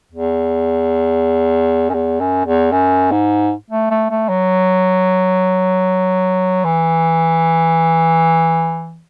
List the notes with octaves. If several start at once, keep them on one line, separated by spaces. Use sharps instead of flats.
E2
F#2
E2
F#2
E2
F#2
G#2
A3
A3
A3
F#3
E3